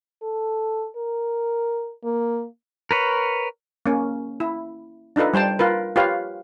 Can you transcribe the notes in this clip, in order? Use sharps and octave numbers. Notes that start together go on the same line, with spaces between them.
A4
A#4
A#3
A#4 B4 C#5
A#3 C#4
E4
D4 D#4 F4 A4 B4
G3 C5 G5 A5
F4 A#4 B4
F4 G4 B4 C#5 F5